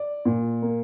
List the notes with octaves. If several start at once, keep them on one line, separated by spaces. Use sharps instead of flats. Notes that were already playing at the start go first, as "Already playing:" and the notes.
Already playing: D5
A#2
A#3